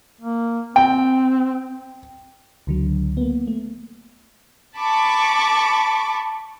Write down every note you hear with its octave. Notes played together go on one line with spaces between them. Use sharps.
A#3
C4 G5
C#2 D3 F#3
A#3 B3
A3
A5 B5 C#6 D6